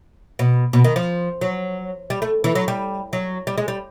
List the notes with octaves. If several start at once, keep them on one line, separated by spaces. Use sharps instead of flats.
B2
B2
D#3
F3
F#3
G3
A3
E3
F#3
G3
F#3
G3
G#3
G3